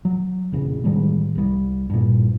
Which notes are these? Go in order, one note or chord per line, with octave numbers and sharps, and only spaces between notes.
F#3
F1 A#1 C#3
A1 D#3 G3 G#3
C2 G3
G2 A#2